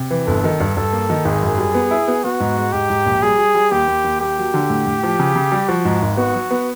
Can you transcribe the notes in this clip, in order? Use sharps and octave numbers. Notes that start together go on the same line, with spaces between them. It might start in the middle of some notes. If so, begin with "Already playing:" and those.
Already playing: C3
E3
G1 A4
D#3
G2
G2 A4
A#3
D#3
G#1 G#4
F#2
G3
B3
E4
B3
B3 F#4
G#2
G#3
G#2 G4
G#2
A#1
G3 G#4
G3
G3
D#2 G4
D#2
D#2
A#3 G4
F#3
D3
A2
A2
F3
C#3
C#3
G3
F3 F#4
G#2
G#1
B3 F#4
F#3
B3